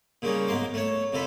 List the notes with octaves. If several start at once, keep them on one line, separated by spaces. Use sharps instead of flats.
A#2 C#3 G3 C#4 D#4
B1 G#2 A#3 C6 D6
A3 C#5
F2 C3 F3 A4 B5